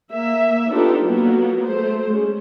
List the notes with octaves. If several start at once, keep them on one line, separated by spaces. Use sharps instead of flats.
A#3 E5
B3 D4 D#4 F4 G4 A4
F#3 A#3 B3 F#4
A3 C5
G#3 C#4